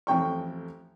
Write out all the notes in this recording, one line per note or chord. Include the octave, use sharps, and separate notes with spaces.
A1 F2 G5 C#6